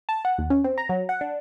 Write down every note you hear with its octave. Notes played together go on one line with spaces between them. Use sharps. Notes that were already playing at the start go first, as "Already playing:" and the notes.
A5
F#5
D#2
C#4
C4
A#5
F#3
F#5
D4